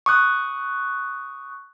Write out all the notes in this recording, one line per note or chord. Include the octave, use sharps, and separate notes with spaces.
C#6 D#6 F#6